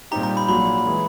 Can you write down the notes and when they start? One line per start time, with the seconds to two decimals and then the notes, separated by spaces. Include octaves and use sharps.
0.11 A#2 G3 C4 D#4 G4 A#5
0.23 A#5
0.37 B5
0.49 A#1 A#2 F#3 B5
0.86 E3 G#3